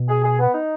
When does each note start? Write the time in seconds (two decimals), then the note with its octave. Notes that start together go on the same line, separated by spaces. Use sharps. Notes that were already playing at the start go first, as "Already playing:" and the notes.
Already playing: B2
0.09 G#4
0.24 G#4
0.39 B3
0.54 D#4